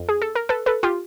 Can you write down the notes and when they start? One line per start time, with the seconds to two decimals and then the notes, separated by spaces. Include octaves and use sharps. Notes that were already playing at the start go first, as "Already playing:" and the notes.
Already playing: F2
0.09 G#4
0.22 A4
0.35 A#4
0.49 A4 B4
0.66 A4 B4
0.83 F4 G4